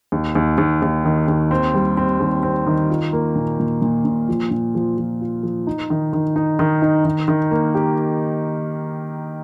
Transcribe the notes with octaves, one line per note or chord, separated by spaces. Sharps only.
D#2
D#2
D#2
D#2
D#3
D#2
C4
G3
C4
D#2
C4
D#3
F4
A#3
A#2
A#2
A#2
A#2
F3
A#2
F3
F3
F4
F3
D#4
D#3
D#3
D#4
D#3
D#4
D#3
D#3
A#3
G4